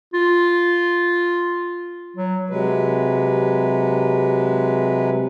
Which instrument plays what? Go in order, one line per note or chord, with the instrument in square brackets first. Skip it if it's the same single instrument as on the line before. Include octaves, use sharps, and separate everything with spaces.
[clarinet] F4
F#3
[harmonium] C3 F#3 G#3 B4